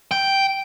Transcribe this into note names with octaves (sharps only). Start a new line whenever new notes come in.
G5